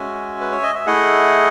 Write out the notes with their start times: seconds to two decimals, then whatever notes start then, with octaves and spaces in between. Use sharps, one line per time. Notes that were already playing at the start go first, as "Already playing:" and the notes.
Already playing: G#3 C#4 F#4 E5 G#5
0.41 B4
0.52 C#5
0.63 D#5
0.75 E5
0.86 A3 E4 G#4 D#5 F#5